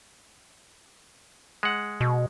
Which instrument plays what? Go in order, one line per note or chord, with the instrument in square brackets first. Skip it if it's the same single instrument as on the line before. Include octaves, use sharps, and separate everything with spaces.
[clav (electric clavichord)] G#3 F#5
[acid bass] B2